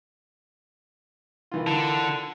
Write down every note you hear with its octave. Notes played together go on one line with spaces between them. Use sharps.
D#3 E3 F4
D3